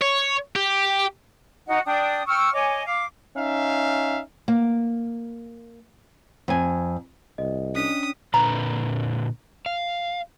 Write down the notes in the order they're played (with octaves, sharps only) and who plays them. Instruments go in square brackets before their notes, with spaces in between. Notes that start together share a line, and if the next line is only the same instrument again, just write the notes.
[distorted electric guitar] C#5
G4
[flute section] D#4 F#4 D#5 F#5
D4 G5 D#6
G5 C#6 E6 F6
C#5 D#5 G#5 D6
F5 D6
[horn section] C#4 D#4 E5 F5
[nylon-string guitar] A#3
F2 G#5
[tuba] C2 [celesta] D#5
[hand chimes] C#4 D4 B6 [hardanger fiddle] D#6
[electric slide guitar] A#2 D3 B4 [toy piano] A#5
[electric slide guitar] F5